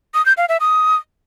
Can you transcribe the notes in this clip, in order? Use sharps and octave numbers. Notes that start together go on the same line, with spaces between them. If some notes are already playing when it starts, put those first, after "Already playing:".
D#6
G6
F5
E5
D#6